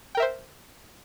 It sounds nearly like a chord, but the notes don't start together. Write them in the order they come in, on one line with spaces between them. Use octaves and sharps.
G5 A#4 E5 C5